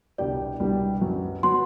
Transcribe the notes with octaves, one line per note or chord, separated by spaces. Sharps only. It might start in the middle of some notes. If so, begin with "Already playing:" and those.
C2 B2 G3 D4 G4 D5
C2 B2 G3 D4 G4
F#2 F#3 B3 F#4
F#3 B3 F#4 C6